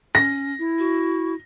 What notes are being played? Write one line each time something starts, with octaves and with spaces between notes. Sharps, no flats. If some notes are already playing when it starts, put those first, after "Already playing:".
C#4 A#6
E4
F#4